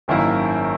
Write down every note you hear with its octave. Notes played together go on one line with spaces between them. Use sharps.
G#1 F#2 D#3 A#3 E4